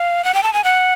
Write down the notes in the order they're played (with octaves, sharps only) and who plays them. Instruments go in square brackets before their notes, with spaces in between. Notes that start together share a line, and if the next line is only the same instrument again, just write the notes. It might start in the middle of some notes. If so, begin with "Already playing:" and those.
Already playing: [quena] F5
F#5
G5
A5
G#5
F#5